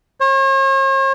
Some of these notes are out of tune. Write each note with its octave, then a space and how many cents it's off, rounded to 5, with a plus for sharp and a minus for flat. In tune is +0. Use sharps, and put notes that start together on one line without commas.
C#5 -45